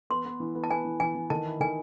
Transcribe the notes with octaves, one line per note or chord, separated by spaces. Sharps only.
B3 C6
B3
E3
B3
A5
B3 G#5
E3
E3 G#5
E3
D#3 A5
E4
D#3 G#5